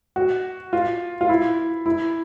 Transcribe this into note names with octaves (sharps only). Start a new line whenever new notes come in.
F#4
F4
F4
E4
E4